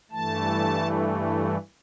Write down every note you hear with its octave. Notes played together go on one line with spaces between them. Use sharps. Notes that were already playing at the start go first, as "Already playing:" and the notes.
G2 E3 A3 A5